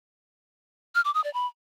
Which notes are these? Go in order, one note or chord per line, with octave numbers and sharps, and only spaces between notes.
F6
D6
D#6
D5
B5